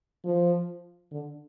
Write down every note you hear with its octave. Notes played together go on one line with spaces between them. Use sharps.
F3
D3